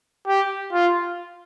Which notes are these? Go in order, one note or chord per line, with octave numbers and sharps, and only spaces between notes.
G4
F4